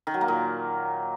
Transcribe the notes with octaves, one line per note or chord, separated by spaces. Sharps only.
D#3
F#3
A#3
A#2